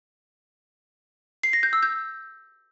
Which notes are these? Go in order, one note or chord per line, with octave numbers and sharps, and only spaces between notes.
C7
A#6
G6
E6
G6